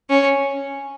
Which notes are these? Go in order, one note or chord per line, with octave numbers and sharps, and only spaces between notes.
C#4